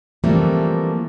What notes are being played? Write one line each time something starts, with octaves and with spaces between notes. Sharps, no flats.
E3 F3 G3 A3 A#3 C4